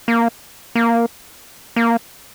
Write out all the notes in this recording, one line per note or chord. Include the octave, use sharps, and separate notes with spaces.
A#3
A#3
A#3